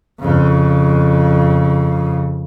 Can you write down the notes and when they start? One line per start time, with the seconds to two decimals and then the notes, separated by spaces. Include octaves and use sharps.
0.20 F2 C#3